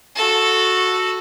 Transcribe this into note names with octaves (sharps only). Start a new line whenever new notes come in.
F#4 A4